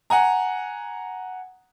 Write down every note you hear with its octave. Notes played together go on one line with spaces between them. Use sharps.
F#5 G#5 A#5